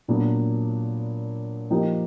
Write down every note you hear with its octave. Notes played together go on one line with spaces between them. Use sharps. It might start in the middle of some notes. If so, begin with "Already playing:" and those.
A#2 F#3 B3 D4
F3 A#3 D#4 G4